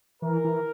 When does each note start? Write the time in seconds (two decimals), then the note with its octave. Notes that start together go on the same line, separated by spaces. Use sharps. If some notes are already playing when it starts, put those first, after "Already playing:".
0.22 E3 A#4
0.44 E3